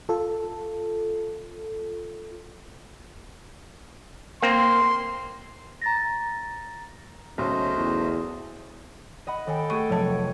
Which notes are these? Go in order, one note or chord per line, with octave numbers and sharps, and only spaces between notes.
F4 A4
A#3 C4 C6
A#5 A6 A#6
B1 C#3 F#3 A3 C#4 C5 D#5
E2
D#5 F#5 B5
D#3 A4 G5 G#5
A3 G#4 C#6 D#7
F1 F#3 C#5 A5